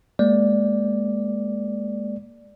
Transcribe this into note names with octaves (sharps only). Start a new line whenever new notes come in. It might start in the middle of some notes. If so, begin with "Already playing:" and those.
G#3 A#3 D5